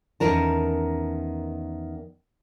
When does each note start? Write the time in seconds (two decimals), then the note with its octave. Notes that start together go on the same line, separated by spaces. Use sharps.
0.20 E2 G2 D#3 C#4 A#4 A5